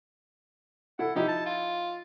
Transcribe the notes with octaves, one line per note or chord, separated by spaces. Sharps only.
E4 A4 F#5
F3 D#4 E4 G4
A5
F4